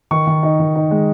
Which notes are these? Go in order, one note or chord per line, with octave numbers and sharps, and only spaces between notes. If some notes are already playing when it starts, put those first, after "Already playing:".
D#3 C#6
D#3
D#4
D#3
D#4
G#3